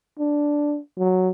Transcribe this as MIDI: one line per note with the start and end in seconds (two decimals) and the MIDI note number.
0.19 0.78 62
0.97 1.31 54